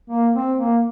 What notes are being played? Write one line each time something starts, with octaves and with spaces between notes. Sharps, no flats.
A#3
C4
A#3